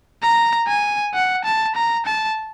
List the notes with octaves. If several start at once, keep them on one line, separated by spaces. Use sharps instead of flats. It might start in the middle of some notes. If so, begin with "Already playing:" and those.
A#5
G#5
F#5
A5
A#5
A5